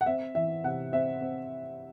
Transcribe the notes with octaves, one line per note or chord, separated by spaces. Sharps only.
F#5
C4 E5
E3 E5
C3 F#5
C4 E5
C4